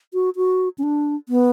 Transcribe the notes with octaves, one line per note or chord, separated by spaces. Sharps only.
F#4
F#4
C#4
D4
B3